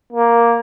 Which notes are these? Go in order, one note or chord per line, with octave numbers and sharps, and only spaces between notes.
A#3